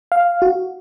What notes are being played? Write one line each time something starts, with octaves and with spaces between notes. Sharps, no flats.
F5
F#4